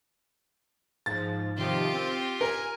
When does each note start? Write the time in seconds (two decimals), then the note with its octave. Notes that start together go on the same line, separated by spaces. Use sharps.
1.06 G#2 F3 A6
1.57 C3 D#3 F3 F4 G4
1.94 C4
2.41 A#4 G#5